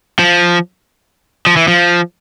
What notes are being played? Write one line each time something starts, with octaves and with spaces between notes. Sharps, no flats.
F3
F3
E3
F3